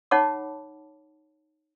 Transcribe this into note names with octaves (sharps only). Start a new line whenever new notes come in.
D#4 C#5 F#5 A5 B5 D6